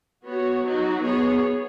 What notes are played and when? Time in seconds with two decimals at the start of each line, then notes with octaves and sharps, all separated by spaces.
0.24 B3 F#4 C#5
0.64 F#3 D#4 F#4
1.02 B3 G#4 C#5